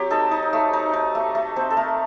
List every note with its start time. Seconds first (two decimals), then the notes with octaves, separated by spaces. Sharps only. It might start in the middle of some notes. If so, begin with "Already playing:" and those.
Already playing: F#3 C4 G4
0.11 D#4 A4
0.31 D#4
0.53 A3
0.73 D#4
0.93 D#4
1.15 A3
1.35 A3
1.56 C4 C5
1.70 A4
1.77 A3 A#4